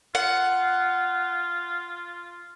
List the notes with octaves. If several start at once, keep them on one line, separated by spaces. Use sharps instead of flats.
F4 F#5